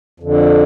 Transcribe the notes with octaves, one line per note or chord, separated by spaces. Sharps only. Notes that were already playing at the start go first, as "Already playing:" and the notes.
F2 D3